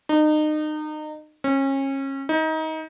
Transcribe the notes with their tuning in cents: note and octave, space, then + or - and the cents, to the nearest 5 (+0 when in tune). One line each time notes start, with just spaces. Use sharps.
D#4 -30
C#4 -30
D#4 +25